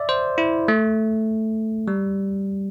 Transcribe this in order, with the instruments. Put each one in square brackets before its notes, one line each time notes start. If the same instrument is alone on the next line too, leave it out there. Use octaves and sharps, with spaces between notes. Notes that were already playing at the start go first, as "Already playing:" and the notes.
Already playing: [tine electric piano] D5 E5
C5
E4
A3
G3